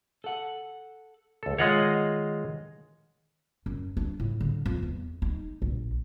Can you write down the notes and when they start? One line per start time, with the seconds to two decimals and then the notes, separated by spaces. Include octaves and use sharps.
0.24 A4 F#5
1.43 C#2 A4
1.58 D#3 G#3 F4 C#5 D#5 F#5
3.66 F#2
3.97 D4
4.20 A2
4.41 D3
4.66 F2
4.83 E2
5.22 D#4
5.62 A#1